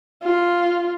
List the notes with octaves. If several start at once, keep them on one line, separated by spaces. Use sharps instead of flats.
F4